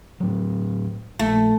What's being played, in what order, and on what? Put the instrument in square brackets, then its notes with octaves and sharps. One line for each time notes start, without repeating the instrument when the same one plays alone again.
[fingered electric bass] A2 F#3
[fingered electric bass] A#1 [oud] A3